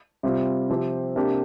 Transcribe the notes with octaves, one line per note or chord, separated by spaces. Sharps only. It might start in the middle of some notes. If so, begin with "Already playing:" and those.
C3 G3 C4 F4
C3 F3 C4 G4 C5
C3 A#3 D4 G4